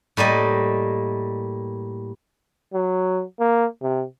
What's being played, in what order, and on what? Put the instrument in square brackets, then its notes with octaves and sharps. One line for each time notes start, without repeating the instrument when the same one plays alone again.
[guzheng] A2 G3 A#3 D#5
[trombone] F#3
A#3
C3